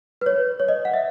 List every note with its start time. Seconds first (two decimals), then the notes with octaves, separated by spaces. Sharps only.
0.21 B4
0.26 C#5
0.60 C#5
0.68 D#5
0.85 F#5
0.94 E5